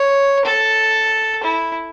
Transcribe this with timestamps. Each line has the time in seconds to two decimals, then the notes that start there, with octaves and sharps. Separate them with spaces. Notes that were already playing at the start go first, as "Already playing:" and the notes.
Already playing: C#5
0.45 A4
1.44 E4